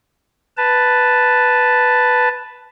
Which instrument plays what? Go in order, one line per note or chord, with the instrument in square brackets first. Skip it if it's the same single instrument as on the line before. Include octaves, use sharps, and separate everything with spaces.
[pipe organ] B4 A5